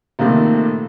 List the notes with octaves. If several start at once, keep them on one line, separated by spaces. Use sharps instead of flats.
A#1 C3 D#3 A3